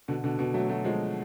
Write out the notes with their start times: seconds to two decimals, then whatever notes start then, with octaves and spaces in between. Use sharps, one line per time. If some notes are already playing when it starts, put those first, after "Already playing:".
0.08 B2 D3
0.24 B2 D3
0.39 B2 D3
0.54 F#3 A3
0.69 F#3 A3
0.84 F3 G#3